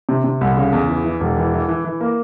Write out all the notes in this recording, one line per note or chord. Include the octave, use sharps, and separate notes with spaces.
C3
C3
C2
C#3
E2
E3
E3
E1
E3
E3
E3
E3
A#3